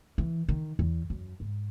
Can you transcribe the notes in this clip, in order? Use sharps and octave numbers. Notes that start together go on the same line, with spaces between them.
E3
D#3
E2
F#2
G#2